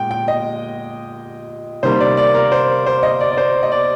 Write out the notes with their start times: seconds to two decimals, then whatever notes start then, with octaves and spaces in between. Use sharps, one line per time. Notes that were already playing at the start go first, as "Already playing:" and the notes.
Already playing: A#2 G#3 G5
0.11 G5
0.28 D#5
1.83 C3 D#3 G3 A#3 C5
2.00 D5
2.17 D5
2.34 A#4
2.52 C5
2.86 C5
3.03 D#5
3.21 D5
3.32 D5
3.37 C5
3.63 D#5
3.72 D5